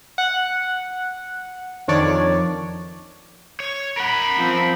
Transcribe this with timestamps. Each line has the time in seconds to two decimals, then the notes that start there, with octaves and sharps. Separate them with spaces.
0.18 F#5
1.88 F2 D#3 D4 C#5 D5
3.60 C#5
3.97 A#4 F#5 B5
4.36 F3 C4